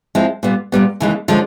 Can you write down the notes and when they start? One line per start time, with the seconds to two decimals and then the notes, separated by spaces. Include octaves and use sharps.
0.15 F3 G#3 C4 E4
0.43 A#2 G3 B3
0.72 A#2 G3 B3
1.00 D#2 C#3 E3 G#3
1.28 D3 F3 G#3 C#4